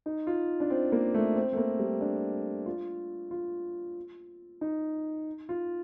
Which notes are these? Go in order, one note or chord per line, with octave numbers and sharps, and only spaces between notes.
D#4
F4
D4
C4
A#3
A3
C4
A3
A#3
G3
D4
F4
F4
D#4
F4